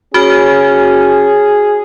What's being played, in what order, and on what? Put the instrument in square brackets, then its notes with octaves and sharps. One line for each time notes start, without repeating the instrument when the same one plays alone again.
[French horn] C#4 [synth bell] F#4 F6 [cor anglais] G#4